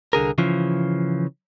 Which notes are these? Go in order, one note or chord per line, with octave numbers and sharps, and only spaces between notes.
C2 D3 G#4 A#4
C#3 E3 F3